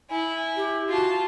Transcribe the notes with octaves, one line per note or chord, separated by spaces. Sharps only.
E4 G#5
G4
F4 F#4 A5